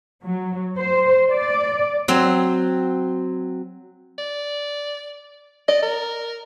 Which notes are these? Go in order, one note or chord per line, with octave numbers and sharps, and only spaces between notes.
F#3
C5
D5
F#3 C4
D5
D5 D#5
A#4